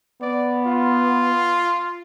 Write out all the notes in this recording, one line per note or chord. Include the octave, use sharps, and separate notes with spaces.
B3 D5
F4